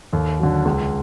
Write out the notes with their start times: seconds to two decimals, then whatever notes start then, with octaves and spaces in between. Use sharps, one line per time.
0.13 D#2 A4
0.39 D3 F#3
0.65 C#2